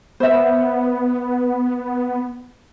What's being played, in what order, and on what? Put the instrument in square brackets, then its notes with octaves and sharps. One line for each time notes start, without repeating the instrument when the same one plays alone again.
[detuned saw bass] B3 [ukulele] C5 E5